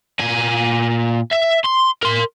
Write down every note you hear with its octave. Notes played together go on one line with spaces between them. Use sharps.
A#2 G#5
E5
C6
A#4 C6